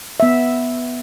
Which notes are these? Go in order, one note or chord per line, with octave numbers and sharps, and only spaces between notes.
B3 E5